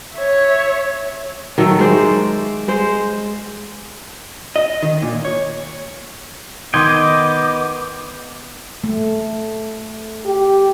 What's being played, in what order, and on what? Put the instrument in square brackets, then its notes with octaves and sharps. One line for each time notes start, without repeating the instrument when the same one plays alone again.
[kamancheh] C#5 E5
[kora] D#3 F#3 A3 A4
G#3 C5 D5
G#3 C5
[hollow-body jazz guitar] D#5
D#3
A#2
C#5
[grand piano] D#3 C6 G#6 [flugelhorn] B3 [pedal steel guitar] D#5 G5 [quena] D6
[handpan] A3
[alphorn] G4